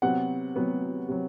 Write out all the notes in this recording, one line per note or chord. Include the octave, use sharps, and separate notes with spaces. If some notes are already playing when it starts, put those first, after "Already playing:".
C3 F#3 B3 F#5
C3 F#3 B3
C3 F#3